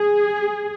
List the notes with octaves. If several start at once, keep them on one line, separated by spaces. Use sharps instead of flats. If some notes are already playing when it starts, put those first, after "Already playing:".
Already playing: G#4